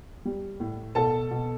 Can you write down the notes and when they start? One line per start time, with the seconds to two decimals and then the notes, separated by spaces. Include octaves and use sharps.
0.25 G3
0.60 A2
0.95 B2 A4 A5
1.31 B2